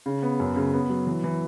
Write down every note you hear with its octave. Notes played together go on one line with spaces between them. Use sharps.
C#3
B3
F#2
C#3
B3
F#3
E3
E3